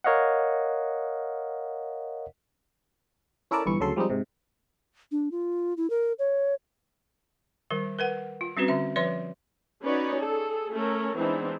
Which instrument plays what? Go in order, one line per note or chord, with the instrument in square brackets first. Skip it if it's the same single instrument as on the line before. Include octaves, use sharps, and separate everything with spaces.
[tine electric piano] A#4 C#5 D#5 F5 F#5
[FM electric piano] C#4 E4 A4 A#4 D5 A5
G1 E3 E4 C#6
D2 C#3 F#3 A4 C6
F3 G3 G#3 C4 D#4
G#2 C3
[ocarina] D4
F4
E4
A#4
C#5
[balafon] D#3 G3 A#4
A#4 B4 F#5
F4
G3 C4 C#4 F#4 B4
D3 E5
F3 B4 C#5 E5 C6
[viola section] C#4 D#4 F#4 B4 C#5 D5
G#4 A4
A3 C#4 A4 A#4
E3 G#3 B3 C4 D4 D#4